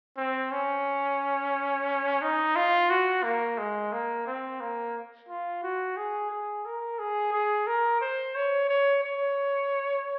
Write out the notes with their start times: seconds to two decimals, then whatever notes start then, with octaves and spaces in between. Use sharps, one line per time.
0.17 C4
0.52 C#4
2.22 D#4
2.56 F4
2.90 F#4
3.24 A#3
3.58 G#3
3.93 A#3
4.27 C4
4.60 A#3
5.29 F4
5.63 F#4
5.97 G#4
6.31 G#4
6.65 A#4
6.99 G#4
7.33 G#4
7.67 A#4
8.01 C5
8.35 C#5
8.69 C#5
9.04 C#5